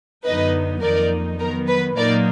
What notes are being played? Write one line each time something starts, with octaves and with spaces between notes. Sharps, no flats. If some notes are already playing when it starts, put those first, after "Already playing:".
F#2 D3 F#3 B3 D#4 B4 D#5
F2 D#3 A#3 D#4 A#4 D5
D#3 F#3 B3 A#4
B4
A#2 F#3 A#3 D#4 A#4 D5